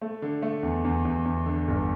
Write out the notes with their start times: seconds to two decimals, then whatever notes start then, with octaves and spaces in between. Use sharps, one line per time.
0.02 A3
0.22 D3
0.42 A3
0.63 E2
0.85 E2
1.05 E2
1.26 E2
1.46 D3
1.68 G1